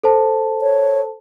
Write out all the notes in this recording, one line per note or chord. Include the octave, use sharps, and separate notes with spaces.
A4 C5 A5
C#5